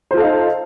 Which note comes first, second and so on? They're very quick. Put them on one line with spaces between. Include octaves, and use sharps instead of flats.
C5 F4 A4 F5 D#4